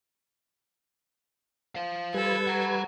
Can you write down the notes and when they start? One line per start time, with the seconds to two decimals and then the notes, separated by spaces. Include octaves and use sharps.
1.75 C5 F5
2.14 G3 A4 B4 G#6
2.47 F#5 A#5